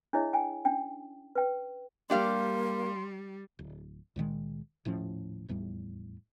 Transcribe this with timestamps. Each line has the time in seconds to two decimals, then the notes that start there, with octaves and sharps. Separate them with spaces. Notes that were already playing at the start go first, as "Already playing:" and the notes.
0.13 D4 E4 G#4 C#5 D#5 E5
0.33 G5 G#5
0.65 C#4 D4 G5
1.35 B4 G5
2.10 G3 A#3 D4 G4 F5 C6
3.59 D1
4.16 C#2 A#2 D#3 G#3
4.85 D#1 A2 F3 C#4
5.49 F1 E2 A2 G3